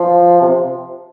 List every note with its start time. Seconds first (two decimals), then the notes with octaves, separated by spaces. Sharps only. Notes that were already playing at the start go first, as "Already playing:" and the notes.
Already playing: F3
0.41 C3